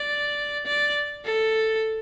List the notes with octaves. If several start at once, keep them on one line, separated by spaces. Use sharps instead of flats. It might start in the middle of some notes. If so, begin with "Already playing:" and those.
Already playing: D5
D5
A4